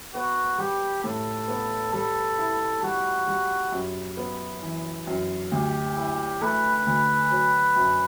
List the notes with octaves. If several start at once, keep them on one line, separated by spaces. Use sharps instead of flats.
B3 F#4
G3 G4
A2 A4
B3
G3 A4
E4
G3 F#4
G3
F#2
B3
E3
F#2
D2 G4
E4
A3 B4
D2
F#3
F#2